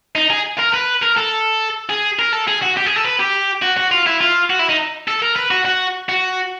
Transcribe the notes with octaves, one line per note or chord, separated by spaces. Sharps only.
D#4
G#4
A#4
B4
A#4
A4
G#4
A#4
A4
G#4
F#4
G4
G#4
A4
B4
G4
F#4
F#4
F4
E4
F4
F#4
E4
D#4
A4
A#4
B4
F#4
F#4
F#4